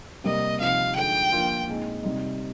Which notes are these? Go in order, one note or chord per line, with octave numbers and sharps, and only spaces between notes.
C3 G3 A#3 D#5
C3 F3 C4 D#4 F5
D3 F3 G#3 D#4 G5
F3 A#3 D4 F4
A#2 G#3 C4 D#4
C3 G3 C4 D#4